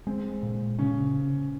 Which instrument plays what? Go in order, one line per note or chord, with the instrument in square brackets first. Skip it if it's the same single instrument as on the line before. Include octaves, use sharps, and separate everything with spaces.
[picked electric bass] G#3 [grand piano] C4
[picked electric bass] A#2
[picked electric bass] C#3 [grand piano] C#4